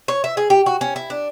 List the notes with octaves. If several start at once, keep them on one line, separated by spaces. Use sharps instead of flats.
C#5
E5
G#4
G4
F#4
C#4
E4
D4